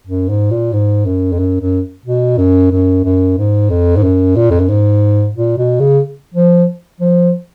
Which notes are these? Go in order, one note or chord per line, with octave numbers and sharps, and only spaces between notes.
F#2
G#2
A#2
G#2
F#2
F2
F#2
F#2
B2
F#2
F#2
F#2
G#2
F2
G#2
F#2
A#2
F2
F#2
G#2
A#2
B2
C#3
F3
F3